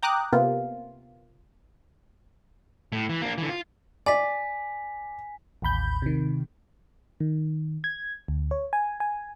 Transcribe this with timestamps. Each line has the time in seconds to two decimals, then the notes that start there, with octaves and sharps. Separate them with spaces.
0.03 G5 A#5 D6 D#6 F#6
0.33 C3 A#3 B3 F4
2.93 A2
3.09 E3
3.22 A#3 D4
3.38 D3 E3
3.49 F4
4.06 D5 G#5 B6
5.62 A1 D#2 B5 G6
6.02 C3 D#3
7.20 D#3
7.84 G#6
8.28 D2
8.51 C#5
8.73 G#5
9.00 G#5